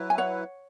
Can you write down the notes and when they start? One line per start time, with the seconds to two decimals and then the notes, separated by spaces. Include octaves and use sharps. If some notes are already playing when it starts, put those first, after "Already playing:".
Already playing: F#3 E4 B4
0.10 G#5
0.18 C#5 F#5